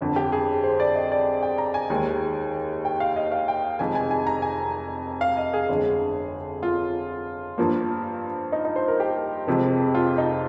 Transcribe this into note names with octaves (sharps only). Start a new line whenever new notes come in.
G1 F2 D3
G4
G#4
C5
D5
D#5
D5
G5
A#5
G#5
D#2 D#3 G#3
G5
F5
D#5
F5
G5
F1 F2 D#3 G#3 G#5
G#5
G#5
A#5
G#5
F5
D#5
G#4
G1 F2 D3 G#3
F4
G2 F3 A#3
D#4
D#4
C5
A#4
G4
F1 F2 C3 F3 G#3
F4
D#4